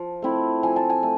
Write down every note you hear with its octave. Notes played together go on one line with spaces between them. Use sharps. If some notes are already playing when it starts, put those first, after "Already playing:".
Already playing: F3
A3 C4 E4
F3 G#5
A5
G#5
A3